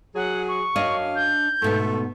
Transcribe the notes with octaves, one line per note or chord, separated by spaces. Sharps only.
F#3 G#4 F#5
C#6
F#2 D4 C#5 D#5 F5
G6
G#2 B2 A3 B3 A4